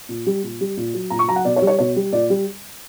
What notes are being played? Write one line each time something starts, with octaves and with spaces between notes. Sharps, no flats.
A#2
G3
A#2
G3
A#2
F#3
A#2 A#5
C#6
F#3 A#5
F#5
B2 D5
C#5
G3
C#5
B2 C#5
G3
A#2 D5
G3